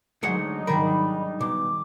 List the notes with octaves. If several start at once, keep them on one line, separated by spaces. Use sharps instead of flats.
D2 F#3 G#3 D4 D#4 C5 C#5 F#5
G#1 D#3 G3 A#4 B5
B2 D6